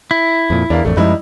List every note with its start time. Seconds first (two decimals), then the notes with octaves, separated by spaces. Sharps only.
0.11 E4
0.50 F2 A#2
0.70 E2 D4 A#4 F5
0.85 A1 F2 A3 D4
0.97 F#2 F3 G3 G#3 D#4 E4